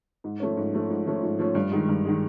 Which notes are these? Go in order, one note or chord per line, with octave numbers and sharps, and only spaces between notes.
G#2
F3 A3 C#4
G#2
F3 A3 C#4
G#2
F3 A3 C#4
G#2
F3 A3 C#4
G2
D#3 G#3
G2
D#3 G#3